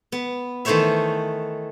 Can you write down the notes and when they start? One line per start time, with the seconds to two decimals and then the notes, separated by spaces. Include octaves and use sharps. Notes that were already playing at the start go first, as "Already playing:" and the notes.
0.12 B3
0.65 D#3 E3 A3 C5 C#5 E5